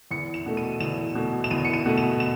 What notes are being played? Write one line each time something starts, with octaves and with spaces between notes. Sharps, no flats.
E2 C#7
E7
B2 A3
D#7
E2 E7
B2 A3
E7
E2 D#7
C#7
D#7
B2 A3
E7
E7